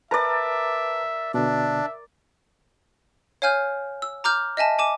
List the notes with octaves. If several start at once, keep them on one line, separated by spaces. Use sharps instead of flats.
A#4 B4 D5 E5 A5 A#5
B2 D3 D4 E5
C#5 F5 G#5 F6 G6
E6
A#5 D6 F6 G6
D#5 E5 G#5 A5
G#5 D6 E7